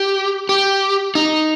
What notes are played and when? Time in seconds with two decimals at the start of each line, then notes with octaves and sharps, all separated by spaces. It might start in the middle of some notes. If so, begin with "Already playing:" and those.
Already playing: G4
0.49 G4
1.15 D#4